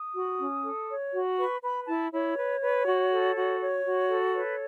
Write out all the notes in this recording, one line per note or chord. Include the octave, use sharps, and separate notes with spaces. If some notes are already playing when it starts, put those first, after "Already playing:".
Already playing: D#6
F#4
C#4
A4
C#5
F#4
B4 C#6
B4 B5
E4 A5
E4 C#5
B4
B4
F#4
A4
F#4
C#5
F#4
A4
B4 C#5